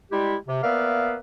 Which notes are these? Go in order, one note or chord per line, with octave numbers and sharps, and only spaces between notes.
G3 G#3 E4 G4
C3
A#3 B3 B4 D5 E5 F5